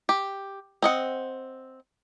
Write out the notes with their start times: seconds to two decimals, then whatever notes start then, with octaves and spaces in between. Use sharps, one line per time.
0.09 G4
0.82 C4 D#5 F#5